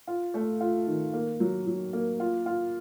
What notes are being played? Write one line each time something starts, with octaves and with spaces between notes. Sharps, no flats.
F4
A3
F4
D#3
A#3
F#3
F#3
A#3
F4
F4